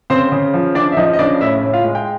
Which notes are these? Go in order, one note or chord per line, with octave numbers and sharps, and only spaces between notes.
C#3 C4 C5
C#3
F3
C#3 D4 D5
E5
F3 D#4 D#5
D#5
C#3 D4 D5
A2 E4 E5
A2
F4 F5
G#3
G5